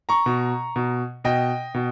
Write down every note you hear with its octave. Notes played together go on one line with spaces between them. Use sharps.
A#5 C#6
B2
B2
B2 D#5 G5
B2